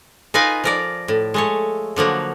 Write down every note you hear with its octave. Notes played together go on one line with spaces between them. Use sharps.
D#4 F4 A#4 B4 F5 G#5
F3 A#4 D5
A2
G#3 A3 C#5
D3 F3 F#3 A#3